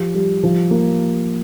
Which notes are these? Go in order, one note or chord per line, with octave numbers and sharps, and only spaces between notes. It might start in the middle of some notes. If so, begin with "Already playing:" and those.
Already playing: F3 G4
G3
F3
A#3